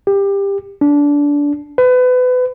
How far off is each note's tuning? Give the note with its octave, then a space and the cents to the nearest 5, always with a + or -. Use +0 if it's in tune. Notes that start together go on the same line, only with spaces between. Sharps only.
G4 +20
D4 -20
B4 +30